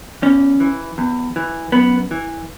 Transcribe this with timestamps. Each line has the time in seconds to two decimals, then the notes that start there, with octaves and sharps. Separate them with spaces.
0.22 E2 C#4
0.60 E3
0.98 E2
1.36 E3
1.72 F#2 B3
2.11 E3